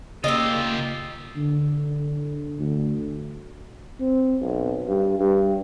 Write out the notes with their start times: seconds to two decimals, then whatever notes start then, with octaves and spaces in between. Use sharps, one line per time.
0.24 C#3 A#3 F4 G4 D#5 E5
1.36 D3
2.59 D2
4.00 C4
4.41 B1
4.87 G2
5.19 G2